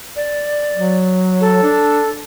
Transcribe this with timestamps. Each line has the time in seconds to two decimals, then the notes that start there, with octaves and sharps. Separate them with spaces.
0.16 D5
0.75 F#3
1.41 A4
1.63 D4